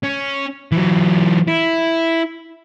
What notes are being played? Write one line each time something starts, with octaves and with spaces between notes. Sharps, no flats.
C#4
E3 F#3
E4